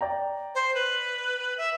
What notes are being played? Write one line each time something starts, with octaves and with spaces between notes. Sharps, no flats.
D5 G5 A#5
C5
B4
E5